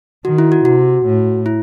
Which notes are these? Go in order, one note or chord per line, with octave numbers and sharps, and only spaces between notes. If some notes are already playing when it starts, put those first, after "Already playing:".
D#3 F#4
E4
F#4
C3 F#4
A2
E4